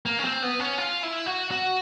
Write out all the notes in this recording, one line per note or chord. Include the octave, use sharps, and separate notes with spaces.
A#3
C#4
C4
B3
C#4
F4
E4
F#4
F#4